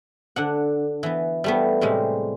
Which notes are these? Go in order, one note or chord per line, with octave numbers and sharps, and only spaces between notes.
D3 D4 F#5
E3 B3
G3 A3 B3
A2 C3 G3 G#3